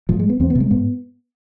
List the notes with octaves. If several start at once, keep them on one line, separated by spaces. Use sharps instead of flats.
G#2 F3
G#3
B3
E2 C4
B3
C3
G#3
G#2 B3